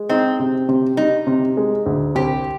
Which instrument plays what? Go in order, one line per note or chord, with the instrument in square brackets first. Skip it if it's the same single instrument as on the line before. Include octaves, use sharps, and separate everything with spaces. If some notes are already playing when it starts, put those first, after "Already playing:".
Already playing: [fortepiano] G#3
[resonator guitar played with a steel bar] C4 [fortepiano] D#4
[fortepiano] C3
C3
[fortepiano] G3 [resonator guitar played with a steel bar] D#4
[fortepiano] C3
G#3
D2
[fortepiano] C2 [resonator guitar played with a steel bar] G4